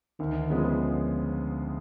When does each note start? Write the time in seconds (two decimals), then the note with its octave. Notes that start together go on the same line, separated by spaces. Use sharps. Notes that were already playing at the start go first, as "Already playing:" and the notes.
0.19 D2 D#3
0.50 C#3 F3 G#3 B3